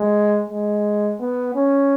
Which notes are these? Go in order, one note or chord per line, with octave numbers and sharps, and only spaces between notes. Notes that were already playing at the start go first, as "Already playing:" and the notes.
Already playing: G#3
G#3
B3
C#4